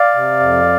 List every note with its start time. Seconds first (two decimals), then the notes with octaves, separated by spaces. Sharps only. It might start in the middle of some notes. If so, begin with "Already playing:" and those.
Already playing: D5 F5
0.15 C3
0.40 F2